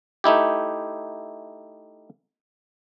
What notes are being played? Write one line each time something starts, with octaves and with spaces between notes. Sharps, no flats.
A3 D#4 E4 G4